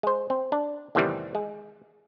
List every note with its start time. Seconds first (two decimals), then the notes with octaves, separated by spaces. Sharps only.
0.03 G#3 C5
0.30 C4
0.52 D4
0.95 E2 A2 C3 D#3 E3 G3
1.35 G#3